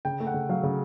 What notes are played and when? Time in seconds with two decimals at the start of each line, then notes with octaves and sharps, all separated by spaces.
0.05 C#3 G5
0.20 A3
0.27 F#5
0.34 C#3
0.49 F#3 F5
0.63 C#3